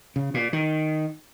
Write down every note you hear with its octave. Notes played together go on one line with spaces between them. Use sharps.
C#3
A#2
D#3